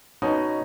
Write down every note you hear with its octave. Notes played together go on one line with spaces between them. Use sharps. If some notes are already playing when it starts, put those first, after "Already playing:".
B2 C#4 D#4